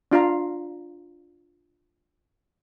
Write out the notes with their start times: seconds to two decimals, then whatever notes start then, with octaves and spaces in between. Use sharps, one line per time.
0.12 D4 F4 F5 A#5